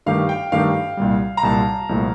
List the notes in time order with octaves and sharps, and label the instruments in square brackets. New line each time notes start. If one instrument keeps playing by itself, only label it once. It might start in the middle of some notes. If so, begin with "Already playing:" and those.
[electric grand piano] G2 D#3 A3 D#4 G4 [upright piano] F5
[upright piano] G5
[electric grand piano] G2 D#3 A3 D#4 G4 [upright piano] F5
[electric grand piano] C2 A#2 G3
[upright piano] A#5
[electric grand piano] C2 A#2 G3 [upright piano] A5
[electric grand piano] C2 A#2 F3 A3